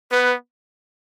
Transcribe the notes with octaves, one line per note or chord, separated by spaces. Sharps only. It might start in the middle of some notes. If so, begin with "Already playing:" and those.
B3 B4